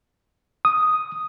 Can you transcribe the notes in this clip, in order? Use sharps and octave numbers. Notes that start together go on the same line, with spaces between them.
D#6